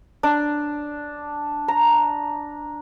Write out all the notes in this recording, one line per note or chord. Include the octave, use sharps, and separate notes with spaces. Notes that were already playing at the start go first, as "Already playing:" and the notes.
D4
A#5